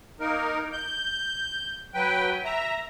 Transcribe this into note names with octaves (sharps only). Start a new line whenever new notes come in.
A#3 D#4 A#4
G6
F#3 B4 G5
E5 A#5